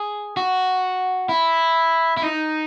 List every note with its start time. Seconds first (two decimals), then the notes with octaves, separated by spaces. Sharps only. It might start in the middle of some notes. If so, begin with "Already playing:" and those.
Already playing: G#4
0.37 F#4
1.29 E4
2.17 E4
2.22 D#4